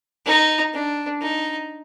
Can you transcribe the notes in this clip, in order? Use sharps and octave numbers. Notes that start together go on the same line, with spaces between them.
D#4
D4
D#4